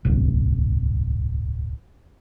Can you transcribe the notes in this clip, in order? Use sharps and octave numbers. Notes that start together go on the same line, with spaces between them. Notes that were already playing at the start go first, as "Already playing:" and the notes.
D1 G1 C2